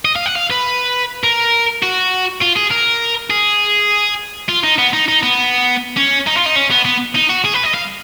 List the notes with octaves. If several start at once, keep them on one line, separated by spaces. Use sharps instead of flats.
D#5
F5
F#5
F5
B4
A#4
F#4
F4
G#4
A#4
G#4
F4
D#4
B3
D#4
D#4
B3
C#4
D#4
F4
D#4
C#4
B3
B3
D#4
F#4
G#4
B4
D#5
F5